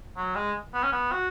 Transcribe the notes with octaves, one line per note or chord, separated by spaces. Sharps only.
F#3
G#3
B3
C#4
B3
F#4